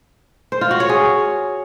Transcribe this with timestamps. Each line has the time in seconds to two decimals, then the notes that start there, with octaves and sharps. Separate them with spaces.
0.52 C5
0.61 F4
0.71 F#4
0.80 C#5
0.89 G#4